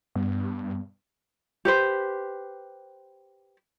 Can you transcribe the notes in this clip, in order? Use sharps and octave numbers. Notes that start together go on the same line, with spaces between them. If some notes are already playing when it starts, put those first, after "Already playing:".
G2 G3 B3
G4 B4 C5